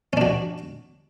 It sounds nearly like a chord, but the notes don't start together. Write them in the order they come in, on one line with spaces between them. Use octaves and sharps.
C#4 D4 F#4